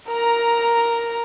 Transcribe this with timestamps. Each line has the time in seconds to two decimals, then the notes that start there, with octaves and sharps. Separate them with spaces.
0.11 A#4 A#5